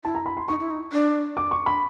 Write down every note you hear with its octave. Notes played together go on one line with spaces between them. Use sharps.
E4 A5
A#5
B5
C6
D#4 C#6
E4
D#4
D4
D6
C#6
B5